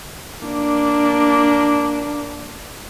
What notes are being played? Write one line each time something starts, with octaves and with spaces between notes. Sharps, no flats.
A#3 D4